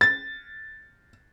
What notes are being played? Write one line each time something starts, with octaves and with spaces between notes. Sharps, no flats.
A6